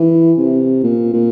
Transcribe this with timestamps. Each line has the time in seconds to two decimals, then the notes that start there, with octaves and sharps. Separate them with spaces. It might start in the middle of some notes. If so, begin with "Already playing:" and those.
Already playing: E3
0.38 C3
0.83 A#2
1.14 A#2